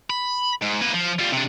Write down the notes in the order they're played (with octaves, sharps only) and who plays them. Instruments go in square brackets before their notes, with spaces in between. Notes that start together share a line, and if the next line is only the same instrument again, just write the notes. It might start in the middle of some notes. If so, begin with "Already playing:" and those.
[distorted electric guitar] B5
G#2
A#3 B4
F3
G3 F4
C3 D4